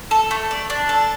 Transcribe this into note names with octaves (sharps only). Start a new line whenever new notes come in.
A4
A3
D5
D4
A4